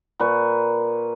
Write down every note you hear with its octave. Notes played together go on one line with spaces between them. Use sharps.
A#2 B4 C#6